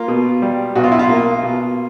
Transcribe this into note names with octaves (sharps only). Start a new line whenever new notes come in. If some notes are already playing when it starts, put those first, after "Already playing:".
Already playing: A#3 F4
B2
G3
B1 F#4
F4
E4
F4
A#3
B2